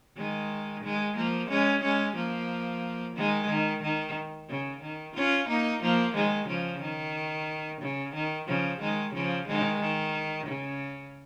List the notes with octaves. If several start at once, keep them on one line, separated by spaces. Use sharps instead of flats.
D#3 G#3
D#3 G#3
F3 A#3
G#3 C#4
G#3 C#4
F3 A#3
D#3 G#3
D#3
D#3
C#3
D#3
C#4 F4
A#3 D#4
F3 A#3
D#3 G#3
C#3 F3
D#3
C#3
D#3
C#3 F3
D#3 G#3
C#3 F3
D#3 G#3
D#3
C#3